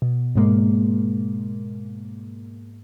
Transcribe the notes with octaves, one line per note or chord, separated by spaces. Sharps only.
B2
G#2 B2 G#3 A#3